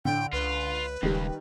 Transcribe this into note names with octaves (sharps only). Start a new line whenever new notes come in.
A2 D3 G5
C#2 F4 B4
D#1 C#2 D#3 G3